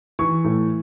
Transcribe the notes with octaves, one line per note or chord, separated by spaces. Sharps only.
E3 C#6
A2